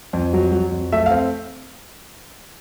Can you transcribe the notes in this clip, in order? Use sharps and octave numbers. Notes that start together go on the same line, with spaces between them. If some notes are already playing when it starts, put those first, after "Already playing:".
F2
F#3
F#3
F2
A3 E5
F5
C4